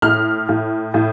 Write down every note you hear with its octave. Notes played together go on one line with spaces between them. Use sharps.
A2 F6
A2
A2